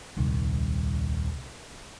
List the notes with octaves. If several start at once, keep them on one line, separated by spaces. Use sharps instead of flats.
D#1 C2 D#3